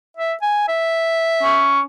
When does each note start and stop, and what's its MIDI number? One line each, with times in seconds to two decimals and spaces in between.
0.17 0.34 76
0.42 0.67 80
0.68 1.78 76
1.43 1.81 61